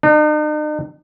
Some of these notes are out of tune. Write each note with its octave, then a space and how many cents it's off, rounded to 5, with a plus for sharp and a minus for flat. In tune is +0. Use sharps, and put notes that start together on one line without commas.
D#4 -45